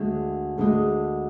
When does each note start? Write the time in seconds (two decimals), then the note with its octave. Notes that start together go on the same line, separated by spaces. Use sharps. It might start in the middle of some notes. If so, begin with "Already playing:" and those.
Already playing: D2 D3 G#3
0.58 D2 D3 G#3